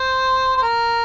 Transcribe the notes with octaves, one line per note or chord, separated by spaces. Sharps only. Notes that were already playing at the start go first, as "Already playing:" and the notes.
Already playing: C5
C5
A#4